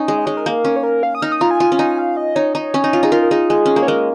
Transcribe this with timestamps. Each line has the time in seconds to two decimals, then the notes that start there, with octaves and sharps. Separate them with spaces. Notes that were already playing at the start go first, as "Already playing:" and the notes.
Already playing: C#4 D#4
0.08 G#3
0.18 D#5
0.26 G#3 C#5
0.37 A#4
0.46 A#3
0.65 C#4
0.76 C#5
0.83 A#4
1.03 F5
1.15 D#6
1.22 D#4 F6
1.32 D#6
1.41 F4 A#5
1.51 G#5
1.60 F4
1.72 C#4
1.79 D#4
1.99 F5
2.17 D#5
2.36 D#4 C#5
2.55 D#4
2.74 C#4
2.84 D#4
2.93 F4
3.03 D#4 G#4
3.12 F4 A#4
3.22 A#4
3.31 D#4 G#4
3.50 G#3
3.66 C#4
3.76 A#3
3.83 C#5
3.88 G#3 A#4